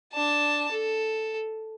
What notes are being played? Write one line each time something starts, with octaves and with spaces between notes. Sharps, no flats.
D4 A5
A4